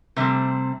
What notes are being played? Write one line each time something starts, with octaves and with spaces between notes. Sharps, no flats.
C3 G3 A3 C4